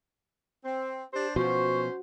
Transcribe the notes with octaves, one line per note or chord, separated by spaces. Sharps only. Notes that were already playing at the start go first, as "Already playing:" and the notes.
C4
D4 G4 C5
B2 F3 C#4 F#4 C5 C#6